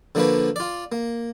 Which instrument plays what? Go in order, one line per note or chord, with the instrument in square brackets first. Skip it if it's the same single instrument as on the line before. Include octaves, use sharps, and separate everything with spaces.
[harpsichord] D3 F3 A#3 D4 F#4 B4
F4 D5
A#3